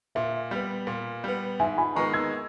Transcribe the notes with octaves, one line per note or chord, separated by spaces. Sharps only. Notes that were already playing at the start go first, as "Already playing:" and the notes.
A#2 E5
G3 B3
A#2
G3 B3
G#2 E5 G#5
G#5 B5
D#3 G#3 B3 A#5 C#6
E6 G#6